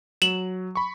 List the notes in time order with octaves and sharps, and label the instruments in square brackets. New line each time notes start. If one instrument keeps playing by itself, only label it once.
[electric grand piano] F#3 [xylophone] E7 F#7
[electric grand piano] B5 C#6